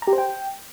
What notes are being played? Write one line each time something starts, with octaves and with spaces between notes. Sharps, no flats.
A#5
G4
C5
G5